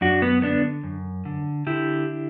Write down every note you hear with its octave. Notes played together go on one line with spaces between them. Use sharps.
F#2 D4 F#4
B3
D3 B3 D4
F#2
D3
D3 E4 G4